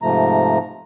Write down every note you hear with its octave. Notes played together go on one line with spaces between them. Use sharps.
G#2 C3 F3 A3 A#5